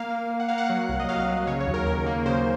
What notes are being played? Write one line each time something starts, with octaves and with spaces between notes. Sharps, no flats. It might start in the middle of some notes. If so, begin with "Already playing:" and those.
Already playing: A#3 F5
A#3
A#3
F#5
A#3 F5
F#5
F#3
C2
D#5
F#3 F5
F#3
C#3 C#5
C#5
D#2
A#4
D#2 A#4
A#3
C#3 C5